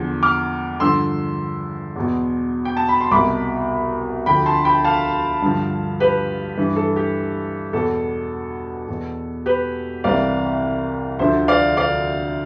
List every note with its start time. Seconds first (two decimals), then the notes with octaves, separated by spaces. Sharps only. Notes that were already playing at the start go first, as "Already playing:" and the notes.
Already playing: E2 D3 F3
0.23 D6 F6
0.80 G2 D3 F3 C6 E6
1.96 E2 B2
2.65 G5
2.77 A5
2.89 B5
3.00 C6
3.11 C2 B2 B5 D6
4.26 D2 D3 F3 G5 B5
4.46 A5 C6
4.65 G5 B5
4.84 F5 A5
5.42 G2 D3 F3
6.00 G4 B4
6.57 G2 E3
6.76 A4
6.96 G4
7.73 E2 B2 A4
8.89 E2 B2
9.46 G4 B4
10.04 C2 C3 E3 D5 F5
11.19 D2 D3 F3 C5 E5
11.48 D5 F5
11.77 D5 F5